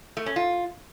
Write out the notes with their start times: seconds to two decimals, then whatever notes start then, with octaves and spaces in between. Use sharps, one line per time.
0.17 A3
0.26 C#4
0.36 F4